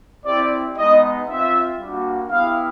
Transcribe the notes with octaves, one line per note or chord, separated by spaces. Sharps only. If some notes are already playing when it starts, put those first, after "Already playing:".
C4 E4 G4 D5
G#3 B3 D#4 D#5
C4 F4 E5
G3 A#3 D4 F#4
B3 E4 G4 F5